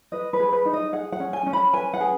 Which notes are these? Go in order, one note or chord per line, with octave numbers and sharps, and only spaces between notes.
B4 D#5
B4
G#4
B4
D#4
D#5
G#4 F#5
F#5
C#4
G#5
C#4
B5
B4 G#5
F#5
G#4